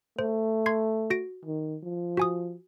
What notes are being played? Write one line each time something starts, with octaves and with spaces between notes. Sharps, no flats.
A3 C5
C6 G#6 C7
F#4 A#6 D7
D#3
F3
F#4 G#5 D#6